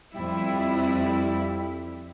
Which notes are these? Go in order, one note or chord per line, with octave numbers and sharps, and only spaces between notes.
F2 G3 E4